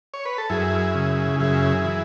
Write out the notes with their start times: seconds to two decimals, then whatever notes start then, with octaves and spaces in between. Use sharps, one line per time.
0.14 C#5
0.25 B4
0.38 A4
0.50 F#2 E4 G#4
0.95 C#3
1.40 F#2 E4 G#4
1.85 E3